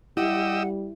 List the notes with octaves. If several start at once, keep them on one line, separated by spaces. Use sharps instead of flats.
G3 E4 G4 D#5 F#5 E6